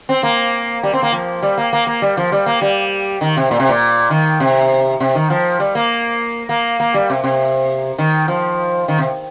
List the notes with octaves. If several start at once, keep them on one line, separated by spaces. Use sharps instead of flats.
C4
A#3
G3
C4
A#3
F3
G3
A#3
A#3
A#3
G3
F3
G3
A#3
G3
D#3
C3
A#2
C3
A#2
D#3
C3
C3
D#3
F3
G3
A#3
A#3
A#3
G3
C3
C3
D#3
F3
D#3
C3